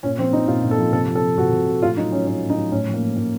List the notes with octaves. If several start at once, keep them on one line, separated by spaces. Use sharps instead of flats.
A#2 C#4
F3 C4
F3 D#4
A#2 F4
A#2
A4
F3
C3 A4
F3
A4
F3
C3 F#4
C3
F3
A2 F4
F#3 D#4
F#3 C#4
A2 C#4
A2
D#4
F#3
A2 C#4
F3
A#3
F3
A2 A#3